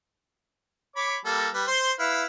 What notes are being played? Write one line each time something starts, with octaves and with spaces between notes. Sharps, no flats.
C#5 B5 D6
G3 A#3 A4
G3 B4
C5 C6
E4 B4 F5